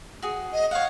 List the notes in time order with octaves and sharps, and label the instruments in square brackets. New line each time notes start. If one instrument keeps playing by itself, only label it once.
[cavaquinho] F#4 G#4
[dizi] D#5
[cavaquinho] C#5 F#5 [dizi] F5